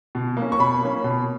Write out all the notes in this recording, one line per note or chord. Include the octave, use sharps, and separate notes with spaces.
B2
A#3
C#4
C#6
B2 B5
A#3 C#4
B2